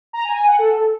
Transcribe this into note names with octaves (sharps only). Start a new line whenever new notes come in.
A#5
G#5
G#5
F#5
A4